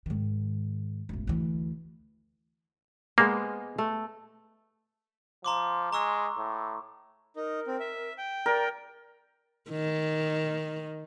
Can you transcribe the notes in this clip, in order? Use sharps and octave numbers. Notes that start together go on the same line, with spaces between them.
G#2 D#3
E1 A1
D2 E3
G#3 A#3 B3 C5
A3
F3 A#5 C6 D6
G#3 A#5 C#6 E6
A2
D#4 A#4
C4
E5
G5
A#4 D5
D#3